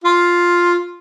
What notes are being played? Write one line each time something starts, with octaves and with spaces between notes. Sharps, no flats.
F4